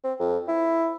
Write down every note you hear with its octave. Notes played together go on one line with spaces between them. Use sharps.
C4
F2
E4